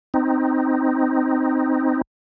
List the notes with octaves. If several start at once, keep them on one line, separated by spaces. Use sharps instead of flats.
C4 D#4